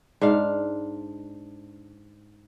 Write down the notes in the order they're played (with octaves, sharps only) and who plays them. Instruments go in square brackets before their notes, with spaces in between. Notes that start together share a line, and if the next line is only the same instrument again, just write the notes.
[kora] G#2 D4 F5